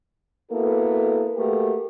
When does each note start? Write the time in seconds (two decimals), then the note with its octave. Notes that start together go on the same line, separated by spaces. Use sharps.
0.51 A#3 B3 E4 F#4 A4
1.37 A3 A#3 F#4 G4 A#4 B4